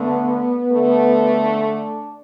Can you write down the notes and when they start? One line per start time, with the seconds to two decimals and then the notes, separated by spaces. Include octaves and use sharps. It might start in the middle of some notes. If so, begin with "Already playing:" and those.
Already playing: D3 A3 B3
0.71 D3 A3
1.42 D4